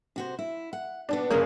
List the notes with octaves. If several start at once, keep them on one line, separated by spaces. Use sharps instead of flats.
C3 F#4 C5
E4
F#5
D#2 B2 B3 D4
F#1 F3 A#3 C#4 D4 G#4